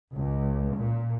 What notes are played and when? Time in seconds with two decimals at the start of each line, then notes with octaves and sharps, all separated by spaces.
0.13 C#2
0.76 A#2